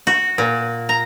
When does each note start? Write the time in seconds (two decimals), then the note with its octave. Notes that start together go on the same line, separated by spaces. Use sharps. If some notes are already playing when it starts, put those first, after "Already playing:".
0.07 F#4
0.38 A#2
0.89 A#5